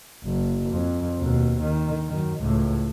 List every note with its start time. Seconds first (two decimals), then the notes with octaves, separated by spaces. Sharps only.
0.25 F#1
0.70 F2
1.19 D#2 B2
1.61 D#3
2.08 F#2 D#3
2.41 C#2 A2